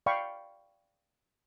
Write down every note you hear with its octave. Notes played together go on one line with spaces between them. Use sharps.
D5 F5 G5 B5 C#6